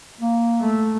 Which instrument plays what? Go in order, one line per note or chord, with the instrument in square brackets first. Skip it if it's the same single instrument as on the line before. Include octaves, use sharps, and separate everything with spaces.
[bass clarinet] A#3
[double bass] A3